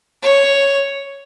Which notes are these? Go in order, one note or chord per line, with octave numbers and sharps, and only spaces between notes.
C#5